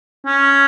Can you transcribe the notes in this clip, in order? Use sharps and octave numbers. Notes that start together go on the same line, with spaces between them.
C#4